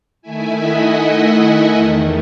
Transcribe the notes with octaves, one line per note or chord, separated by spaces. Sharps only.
D#3 A3 E4 E5 G#5
D#5 F#5
E2 D#3 A3